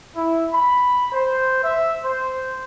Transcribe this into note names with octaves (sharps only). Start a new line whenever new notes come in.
E4
B5
C5
E5
C5